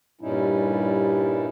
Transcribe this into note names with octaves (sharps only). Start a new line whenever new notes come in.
G2 A#2 G3 C#4 D#4 E4